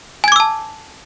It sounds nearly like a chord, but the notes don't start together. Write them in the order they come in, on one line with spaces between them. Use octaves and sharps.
G#5 G#6 D6 E6 A5